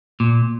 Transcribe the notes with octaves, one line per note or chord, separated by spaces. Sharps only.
A#2